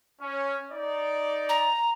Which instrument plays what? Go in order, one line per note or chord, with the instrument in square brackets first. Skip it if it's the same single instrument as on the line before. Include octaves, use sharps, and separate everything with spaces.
[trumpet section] C#4
D#4 D5
[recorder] A#5